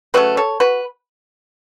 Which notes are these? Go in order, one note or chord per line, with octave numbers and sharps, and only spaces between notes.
C#3 F#3 A3 F#4 B4
A4 C#5
F#4 B4